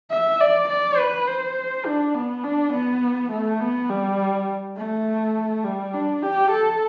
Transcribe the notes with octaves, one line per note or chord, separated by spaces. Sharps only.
E5
D5
D5
B4
C5
D4
B3
D4
B3
A3
B3
G3
A3
G3
D4
G4
A4